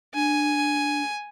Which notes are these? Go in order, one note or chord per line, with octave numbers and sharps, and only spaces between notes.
D4 G#5